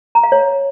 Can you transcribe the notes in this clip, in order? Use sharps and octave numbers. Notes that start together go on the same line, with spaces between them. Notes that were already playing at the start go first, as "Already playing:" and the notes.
A#5
F5
C#5